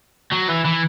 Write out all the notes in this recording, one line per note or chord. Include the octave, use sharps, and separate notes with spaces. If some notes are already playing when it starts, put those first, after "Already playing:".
F#3
E3
E3